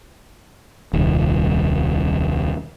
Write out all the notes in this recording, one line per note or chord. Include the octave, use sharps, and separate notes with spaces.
D#1 C2